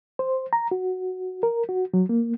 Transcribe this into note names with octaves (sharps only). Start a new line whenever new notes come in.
C5
A#5
F#4
A#4
F#4
F#3
A#3